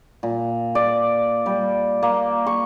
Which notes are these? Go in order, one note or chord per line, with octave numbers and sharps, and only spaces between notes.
A#2
D5
G3
A#3
C#6